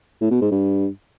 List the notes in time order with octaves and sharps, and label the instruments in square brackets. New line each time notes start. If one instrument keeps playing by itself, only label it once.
[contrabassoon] A2
B2
G#2
G2